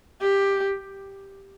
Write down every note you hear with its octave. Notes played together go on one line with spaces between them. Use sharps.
G4